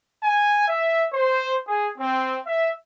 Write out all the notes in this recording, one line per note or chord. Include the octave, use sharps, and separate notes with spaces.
G#5
E5
C5
G#4
C4
E5